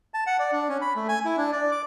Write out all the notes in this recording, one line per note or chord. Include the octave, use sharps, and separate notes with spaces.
A5
F#5
D5
D4
C#4
B5
A3
G#5
E4
D4
D5
D6